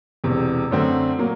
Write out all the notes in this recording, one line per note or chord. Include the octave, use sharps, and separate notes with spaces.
E1 E2 C3
F#2 D3 F#3 A3 C4
A#2 F#3 A#3